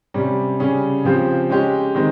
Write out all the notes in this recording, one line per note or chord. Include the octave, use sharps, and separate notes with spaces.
C3 G3 C#4
C#3 G3 C#4 G#4
C#3 F3 C4 G4
G#3 C#4 G4
D#3 G#3 C4